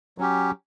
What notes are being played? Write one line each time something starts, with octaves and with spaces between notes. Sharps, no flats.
F#3 C#4 G4